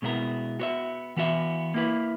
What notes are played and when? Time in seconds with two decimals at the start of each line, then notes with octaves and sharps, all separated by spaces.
0.02 B2 G#3 B3 E4 A#4
0.60 B3 F#4 C#5 E5
1.17 E3 B3 F#4 C#5 E5
1.74 A#3 E4 B4